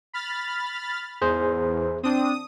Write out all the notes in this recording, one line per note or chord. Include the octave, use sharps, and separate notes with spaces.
B5 F6 A6
E2 G#4 C5
C4 D4 D#6